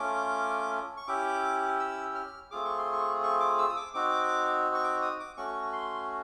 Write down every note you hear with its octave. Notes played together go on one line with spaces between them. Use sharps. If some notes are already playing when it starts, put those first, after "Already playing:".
Already playing: A3 C#4 F4 D6
C#6
C#4 E4 G4 D6
E6
F6
A3 C4 F4 G#4 D6
C#6
C6
C#6
C#6
D6
E6
D#6
D6
C4 D#4 F#4 D6
C#6
D6
D#6
D6
A3 C#4 F#4 C#6
C6